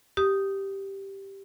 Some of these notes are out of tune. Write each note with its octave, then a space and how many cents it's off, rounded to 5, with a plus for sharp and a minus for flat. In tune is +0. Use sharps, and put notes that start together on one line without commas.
G4 -5 D#6 +0